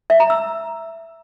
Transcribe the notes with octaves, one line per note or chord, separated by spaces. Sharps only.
E5
A#5
E6